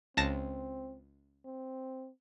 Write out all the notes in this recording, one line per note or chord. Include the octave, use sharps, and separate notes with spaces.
C#2 C4 A5 A#6
C4